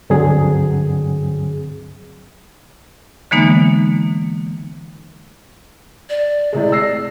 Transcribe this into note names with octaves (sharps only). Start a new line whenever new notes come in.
C#2 G2 D3 F#3 C4 G#4
D3 E3 G#3 A#3 B3 D#4
D5
A2 C3 G#3
E6 A#6 C7